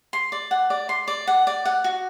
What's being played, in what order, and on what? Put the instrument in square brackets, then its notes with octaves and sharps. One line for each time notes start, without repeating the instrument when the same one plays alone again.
[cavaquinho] C6
D5
F#5
D5
C6
D5
F#5
D5
F#5
F#4